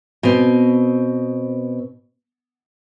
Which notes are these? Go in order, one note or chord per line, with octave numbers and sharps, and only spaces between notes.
B2 C4